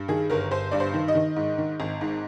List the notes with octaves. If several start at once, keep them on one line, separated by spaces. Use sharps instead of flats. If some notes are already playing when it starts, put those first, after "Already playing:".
Already playing: G2
D#3 G#4
G1 A#4
G1 C5
G2 D5
C5
D#3
D#5
D#3
G#2
D#3
G#1
G#2